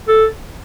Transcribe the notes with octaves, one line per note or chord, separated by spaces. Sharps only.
A4